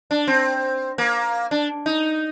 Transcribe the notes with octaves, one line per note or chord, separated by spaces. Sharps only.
D4
C4
A#3
D4
D#4